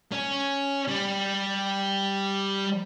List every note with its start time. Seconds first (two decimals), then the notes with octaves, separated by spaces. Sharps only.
0.12 C#4
0.88 G3